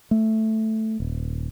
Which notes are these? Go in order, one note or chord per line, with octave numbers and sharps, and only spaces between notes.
A3
D#1